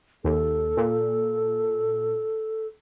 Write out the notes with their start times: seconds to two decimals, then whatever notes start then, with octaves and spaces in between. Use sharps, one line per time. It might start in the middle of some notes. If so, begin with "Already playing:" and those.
0.24 D#2 A4
0.77 A#2